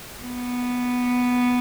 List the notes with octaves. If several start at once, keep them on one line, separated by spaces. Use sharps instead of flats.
B3